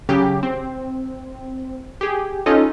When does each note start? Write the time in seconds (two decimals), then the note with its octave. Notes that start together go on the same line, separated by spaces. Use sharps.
0.09 C#3 F#3 G4
0.43 C4
2.01 G4 G#4
2.46 C#4 D#4 F4 A4 D#5